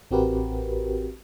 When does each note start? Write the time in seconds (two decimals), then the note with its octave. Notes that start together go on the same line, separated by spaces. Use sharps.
0.11 A1 C4 F#4 G4 A#4 B4